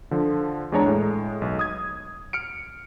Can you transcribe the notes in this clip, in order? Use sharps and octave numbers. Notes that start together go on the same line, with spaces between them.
D3 F3
E2 G#3 D4 C#5 A#5
A2 G#3
B1
D#6 G#6
F6 C#7 D7